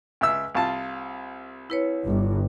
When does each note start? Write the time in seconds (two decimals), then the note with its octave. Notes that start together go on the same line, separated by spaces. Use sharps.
0.21 C#2 E5 E6
0.55 C2 F4 A5
1.70 E4 B4 C#5
2.05 G1 G2